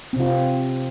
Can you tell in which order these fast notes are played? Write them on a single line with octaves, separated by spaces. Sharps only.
C4 C3 F4